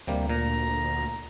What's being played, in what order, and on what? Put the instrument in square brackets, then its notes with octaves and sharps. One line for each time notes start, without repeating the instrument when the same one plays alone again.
[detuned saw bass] D2 [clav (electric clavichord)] C3 G3 A#3
[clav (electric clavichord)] A#2 [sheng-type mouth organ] A#5